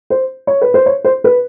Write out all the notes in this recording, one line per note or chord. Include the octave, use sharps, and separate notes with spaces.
C5
C#5
B4
C5
C#5
C5
B4